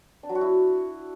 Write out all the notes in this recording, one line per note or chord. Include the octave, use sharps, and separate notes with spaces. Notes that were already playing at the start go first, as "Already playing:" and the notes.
D4
F#3
F#4
E4